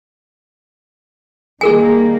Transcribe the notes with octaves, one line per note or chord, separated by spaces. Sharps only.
D#3 G3 A#3 G#4 A#4 G#5